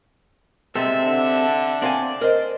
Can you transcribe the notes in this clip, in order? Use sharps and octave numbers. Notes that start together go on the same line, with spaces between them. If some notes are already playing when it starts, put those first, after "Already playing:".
C3 G#3 C4 A4 E5
D3
C4 D5 F5 G#5
A#4 C5 D#5